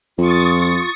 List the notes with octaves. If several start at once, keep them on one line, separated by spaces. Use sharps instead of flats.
F2 F4 C#6 D#6 A6